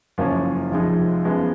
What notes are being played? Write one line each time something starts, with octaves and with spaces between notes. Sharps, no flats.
F#1 F#2 F3 A#3 C#4
F1 F2 F3 G#3 D#4
F#2 F3 G#3 B3 F4